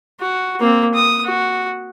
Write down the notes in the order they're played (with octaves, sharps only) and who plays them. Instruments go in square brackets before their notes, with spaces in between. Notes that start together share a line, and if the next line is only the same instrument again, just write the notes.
[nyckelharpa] F#4
A#3 C4
D#6
F#4